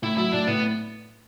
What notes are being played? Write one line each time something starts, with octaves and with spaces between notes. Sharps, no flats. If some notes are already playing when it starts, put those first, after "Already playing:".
A2 E4
F#3 E4
A2 D4
A2 B3